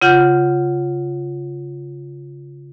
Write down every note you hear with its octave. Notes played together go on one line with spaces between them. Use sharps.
C#3 F4 F#5 G6